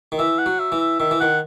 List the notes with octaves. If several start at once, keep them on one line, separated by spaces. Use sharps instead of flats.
D#3
E3 E5
F#5
F#3
E5
E3
E5
D#3 E5
E3
D#3 F#5